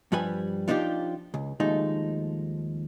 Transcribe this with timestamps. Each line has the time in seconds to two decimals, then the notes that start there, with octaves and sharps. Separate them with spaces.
0.12 G2 F3 G3 B4 G#5
0.68 F3 D4 D#4 F4 G4
1.34 C#2
1.60 D#2 F3 G#3 A3 D#4